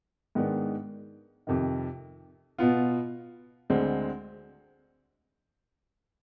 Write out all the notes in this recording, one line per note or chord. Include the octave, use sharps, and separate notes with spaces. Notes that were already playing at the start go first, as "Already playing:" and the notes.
G#2 D#3 G#3 B3 D4
F2 C3 D#3
B2 B3 F4
D2 D3 G#3 C4